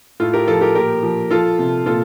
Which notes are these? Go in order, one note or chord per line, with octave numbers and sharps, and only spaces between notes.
A2 F4 A4
G4 A#4
F3 F4 A4
G4 A#4
A#2 G4 A#4
F3
F3 F4 A4
C3
A#2 F4 A4